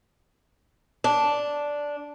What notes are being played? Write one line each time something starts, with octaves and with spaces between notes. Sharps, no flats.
D4